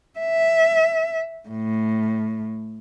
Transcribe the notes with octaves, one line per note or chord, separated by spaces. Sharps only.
E5
A2